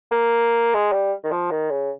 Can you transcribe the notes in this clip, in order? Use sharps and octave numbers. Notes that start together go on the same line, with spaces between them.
A#3
G#3
G3
D#3
F3
D#3
C#3